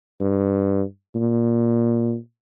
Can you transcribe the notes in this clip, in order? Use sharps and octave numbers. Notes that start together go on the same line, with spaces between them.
G2
A#2